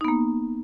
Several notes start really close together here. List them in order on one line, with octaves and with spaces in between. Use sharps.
D#4 B3 A#3